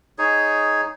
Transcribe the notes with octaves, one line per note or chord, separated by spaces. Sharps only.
D#4 G#4 C#5